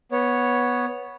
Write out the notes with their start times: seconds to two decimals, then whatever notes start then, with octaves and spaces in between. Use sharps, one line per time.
0.12 B3 C#5